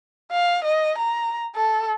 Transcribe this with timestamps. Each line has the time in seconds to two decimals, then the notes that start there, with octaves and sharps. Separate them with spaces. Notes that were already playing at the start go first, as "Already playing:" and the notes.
0.31 F5
0.64 D#5
0.98 A#5
1.55 A4